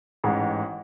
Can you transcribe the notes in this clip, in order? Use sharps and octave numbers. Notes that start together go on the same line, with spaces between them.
A1 G#2 G#3